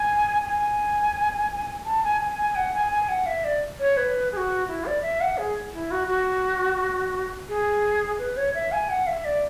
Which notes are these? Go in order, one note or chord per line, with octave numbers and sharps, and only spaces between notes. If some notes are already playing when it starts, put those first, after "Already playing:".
Already playing: G#5
G#5
A5
G#5
G#5
G#5
F#5
G#5
G#5
F#5
E5
D5
C#5
B4
G#4
F#4
E4
D5
E5
F#5
G#4
E4
F#4
F#4
G#4
B4
C#5
E5
G#5
F#5
E5
D5